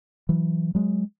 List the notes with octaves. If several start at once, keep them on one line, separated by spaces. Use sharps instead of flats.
E3 F#3
F#3 G#3